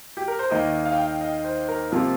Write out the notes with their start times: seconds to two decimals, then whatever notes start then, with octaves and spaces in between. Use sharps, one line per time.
0.17 G4
0.28 A#4
0.39 C5
0.50 D#2 D#3 A#3 D#5
0.85 F5
0.93 G5
1.01 F5
1.21 D#5
1.44 C5
1.68 A#4
1.92 C3 F3 A#3 F4